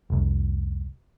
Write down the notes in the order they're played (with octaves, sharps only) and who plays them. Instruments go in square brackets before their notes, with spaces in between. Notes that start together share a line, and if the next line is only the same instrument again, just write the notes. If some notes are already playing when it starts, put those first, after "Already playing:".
[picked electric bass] F1 C2